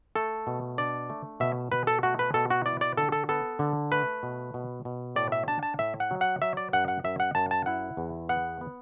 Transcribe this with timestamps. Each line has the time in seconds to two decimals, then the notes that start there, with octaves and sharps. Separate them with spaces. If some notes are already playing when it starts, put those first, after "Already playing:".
0.16 A3 A4
0.47 B2
0.78 D4 D5
1.10 A3
1.40 B2 E5
1.72 B2 B4
1.87 A4
2.03 A3 F#4
2.19 B4
2.34 B2 A4
2.50 F#4
2.66 E4 D5
2.81 D5
2.97 D3 A4
3.12 A4
3.29 B3 A4
3.59 D3
3.92 A3 B4
4.23 B2
4.54 B2
4.85 B2
5.16 A2 D5
5.32 E5
5.48 D4 A5
5.63 A5
5.79 A2 E5
6.00 F#5
6.11 F#3
6.21 F#5
6.42 F#3 E5
6.57 D5
6.73 F#2 F#5
6.88 F#5
7.04 F#2 E5
7.20 F#5
7.35 F#2 A5
7.51 A5
7.66 E4 F#5
7.97 E2
8.29 B3 F#5
8.61 B3